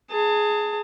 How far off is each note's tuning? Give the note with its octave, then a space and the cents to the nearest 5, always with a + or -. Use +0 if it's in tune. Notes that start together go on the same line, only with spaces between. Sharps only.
G#4 +10 A5 +35